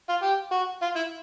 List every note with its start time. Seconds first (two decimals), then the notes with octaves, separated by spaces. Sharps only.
0.09 F4
0.23 G4
0.52 F#4
0.82 F4
0.96 E4